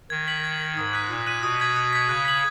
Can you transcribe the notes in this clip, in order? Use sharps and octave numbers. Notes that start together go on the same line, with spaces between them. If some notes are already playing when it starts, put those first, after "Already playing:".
D#3 G#6
B6 F#7
G#6
B6 F#7
G#2 D#6
F#6 B6 D#7 F#7
A#2 D#6
F#6 B6 D#7 F#7
B2 D#6
G#6 B6
D#6
G#6 B6
C#3 F#6
B6 F#7